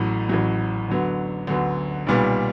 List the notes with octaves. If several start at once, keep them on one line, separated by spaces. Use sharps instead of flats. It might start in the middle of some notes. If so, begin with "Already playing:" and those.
Already playing: A1 A2 F#3
A1 A2 F#3
D2 D3 F#3 B3
D2 D3 F#3 B3
B1 A#2 G3 B3